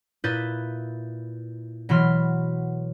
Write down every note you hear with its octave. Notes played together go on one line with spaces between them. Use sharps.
A#2 E4 B4 D#6 G6 A6
B2 E3 F#3 B5 C6 F6